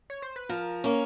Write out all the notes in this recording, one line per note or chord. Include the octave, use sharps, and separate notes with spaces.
C#5
C5
B4
F3 A#4
A#3 C#4